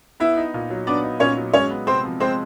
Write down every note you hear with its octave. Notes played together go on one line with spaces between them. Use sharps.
B3 E4 E5
D#4
A#2
F#3
B3 D4 D5
D#4
A#2 C#4 C#5
F#3
G#3 C#4 C#5
B3
C3 C4 C5
F3
G#3 C4 C5